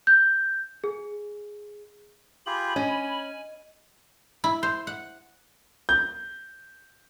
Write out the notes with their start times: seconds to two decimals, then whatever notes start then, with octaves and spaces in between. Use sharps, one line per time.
0.07 G6
0.84 G#4
2.47 F4 G4 G#4 B5
2.76 C#4 D#5 G#5
4.44 E4
4.63 C5
4.87 F#5
5.89 G6